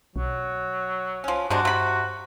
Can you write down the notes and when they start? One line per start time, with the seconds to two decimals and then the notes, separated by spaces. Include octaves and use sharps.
0.16 B1 F#3
1.24 F3 C#4
1.50 G2 C3 G#3 D4 F#4
1.65 C3 B5